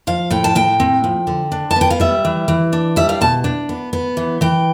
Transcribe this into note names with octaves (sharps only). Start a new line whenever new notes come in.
F3 F5
A2 G5
A5
A2 G5
C4
F3
D3
D4
A5
B3
G5
F5
G3 E5
E3
E3
D4
G3 E5
F5
B2 A5
D4
B3
B3
E3
E3 G5